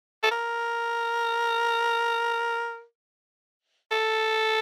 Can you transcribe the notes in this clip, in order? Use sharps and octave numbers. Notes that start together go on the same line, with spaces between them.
A4
A#4
A4